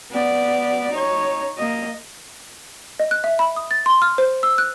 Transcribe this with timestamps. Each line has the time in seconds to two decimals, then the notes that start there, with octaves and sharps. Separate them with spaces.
0.10 B3 D5
0.91 D#4 C#5
1.58 A#3 D#5
3.00 D#5
3.11 F#6
3.24 E5
3.39 B5
3.56 D#6
3.71 A6
3.86 C6
4.02 F6
4.18 C5
4.43 E6
4.58 F#6